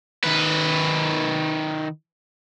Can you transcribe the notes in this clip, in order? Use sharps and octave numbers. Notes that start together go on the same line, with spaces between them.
D#3 B4